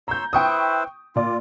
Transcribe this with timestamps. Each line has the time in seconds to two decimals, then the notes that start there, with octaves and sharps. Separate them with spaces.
0.08 C#5 A#5 C6 E6 G6
0.33 E4 B4 C5 G5 C#6 D#6
1.16 A#2 F4 D5